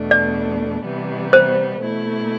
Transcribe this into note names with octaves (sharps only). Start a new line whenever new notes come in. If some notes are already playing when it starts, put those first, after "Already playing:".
Already playing: E2 B2 A3 D4
D5
C3 E3 G3 B3
C5
B2 A3 E4